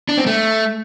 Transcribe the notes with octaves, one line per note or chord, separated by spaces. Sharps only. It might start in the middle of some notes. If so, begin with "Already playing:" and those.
D4
C4
A3